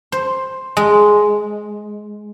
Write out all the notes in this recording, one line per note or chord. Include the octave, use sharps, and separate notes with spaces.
C5
G#3